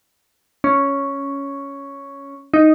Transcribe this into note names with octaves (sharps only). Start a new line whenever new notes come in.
C#4
D#4